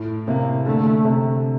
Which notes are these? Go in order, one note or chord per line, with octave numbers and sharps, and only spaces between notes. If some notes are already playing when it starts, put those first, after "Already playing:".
Already playing: A2
C3 A#3
D3 A3
C3